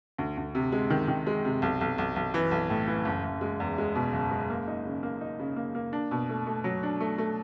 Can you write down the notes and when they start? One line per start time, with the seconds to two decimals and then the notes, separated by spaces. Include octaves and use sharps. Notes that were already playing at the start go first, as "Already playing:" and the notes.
0.18 D2
0.37 D2
0.55 C3
0.72 G#3
0.90 D#3
1.08 D#3
1.27 G#3
1.45 C3
1.62 B1
1.81 B1
1.98 B1
2.16 B1
2.34 E3
2.51 B1
2.70 A2
2.88 E3
3.05 F#1
3.24 F#1
3.41 G#3
3.60 E2
3.78 G#3
3.95 B2
4.13 F#1
4.31 G#3
4.50 A#3
4.68 D#4
4.86 C#3
5.03 A#3
5.21 D#4
5.39 C#3
5.56 A#3
5.75 A#3
5.93 D4
6.11 B2
6.29 A3
6.47 A3
6.64 F#3
6.83 D4
7.00 A3
7.18 A3